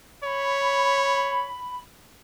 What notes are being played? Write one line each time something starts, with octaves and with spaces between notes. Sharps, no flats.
C#5 B5